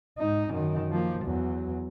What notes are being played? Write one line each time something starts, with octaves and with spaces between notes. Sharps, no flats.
G#2 D#4
F#2 D#3
F3 A#3
E2 F#3